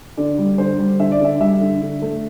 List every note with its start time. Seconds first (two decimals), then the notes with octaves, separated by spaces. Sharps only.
0.17 D3 D5
0.38 G3
0.58 D3 C5
0.79 G3
0.99 D3 E5
1.12 D5
1.20 D3 E5
1.40 G3 E5
1.61 D3
1.82 D3
2.02 A3